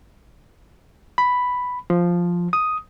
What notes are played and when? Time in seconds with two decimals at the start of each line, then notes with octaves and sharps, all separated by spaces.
1.18 B5
1.90 F3
2.53 D#6